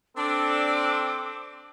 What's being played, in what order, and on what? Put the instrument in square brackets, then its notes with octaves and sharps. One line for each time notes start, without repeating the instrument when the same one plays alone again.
[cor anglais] C4 [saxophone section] D4 [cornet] A4 [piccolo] D6